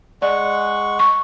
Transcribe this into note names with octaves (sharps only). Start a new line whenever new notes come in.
G#3 D5 F#5 C#6
C#6